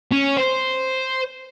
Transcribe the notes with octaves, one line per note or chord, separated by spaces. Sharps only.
C#4
C5